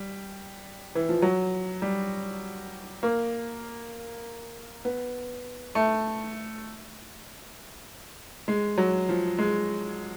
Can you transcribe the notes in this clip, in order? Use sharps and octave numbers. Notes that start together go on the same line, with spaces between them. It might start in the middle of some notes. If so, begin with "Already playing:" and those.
Already playing: G3
E3
F3
F#3
G3
A#3
B3
A3
G#3
F#3
F3
G#3